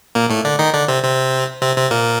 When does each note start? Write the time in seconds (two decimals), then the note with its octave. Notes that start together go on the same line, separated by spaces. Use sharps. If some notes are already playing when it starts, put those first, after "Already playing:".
0.15 A#2 A#3
0.30 A2 A3
0.45 D3 D4
0.59 D#3 D#4
0.73 D3 D4
0.88 C3 C4
1.03 C3 C4
1.62 C3 C4
1.76 C3 C4
1.91 A#2 A#3